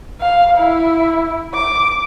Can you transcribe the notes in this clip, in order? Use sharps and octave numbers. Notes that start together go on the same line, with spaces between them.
F5
E4
D6